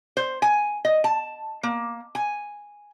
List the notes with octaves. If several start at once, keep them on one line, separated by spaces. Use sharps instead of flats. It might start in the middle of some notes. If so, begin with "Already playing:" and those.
C5
G#5
D#5
A5
A#3
G#5